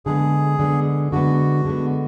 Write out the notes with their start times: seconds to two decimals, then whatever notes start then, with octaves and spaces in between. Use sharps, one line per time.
0.06 D3 G#3 B3 G#4
0.59 D3 G#3 B3
1.12 D3 G#3 B3 F#4
1.65 D3 G#3 B3